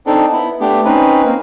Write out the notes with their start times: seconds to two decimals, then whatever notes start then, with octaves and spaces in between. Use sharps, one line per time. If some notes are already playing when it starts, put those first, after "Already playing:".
0.06 C4 D4 D#4 A4
0.32 B3 E4
0.60 A3 B3 D4 G4
0.85 C4 C#4 D#4 B4
1.24 A#3 C4